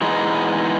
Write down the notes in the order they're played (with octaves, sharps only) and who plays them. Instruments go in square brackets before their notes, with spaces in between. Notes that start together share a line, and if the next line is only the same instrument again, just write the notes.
[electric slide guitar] E3 G#3 B3 D#4 G#4